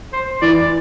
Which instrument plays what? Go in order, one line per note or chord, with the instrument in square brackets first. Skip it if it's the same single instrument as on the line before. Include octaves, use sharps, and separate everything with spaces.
[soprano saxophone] C5
[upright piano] E3 [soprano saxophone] D5